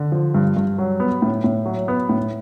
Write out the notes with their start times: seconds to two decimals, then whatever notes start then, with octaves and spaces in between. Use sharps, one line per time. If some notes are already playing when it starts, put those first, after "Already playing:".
Already playing: D3
0.12 F3
0.34 G2
0.57 G2
0.78 F#3
1.00 B3
1.22 A2
1.44 A2
1.65 F#3
1.88 B3
2.09 A2